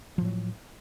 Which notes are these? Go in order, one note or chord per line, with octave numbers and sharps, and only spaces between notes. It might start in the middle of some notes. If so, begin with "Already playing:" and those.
A2 F3 F#3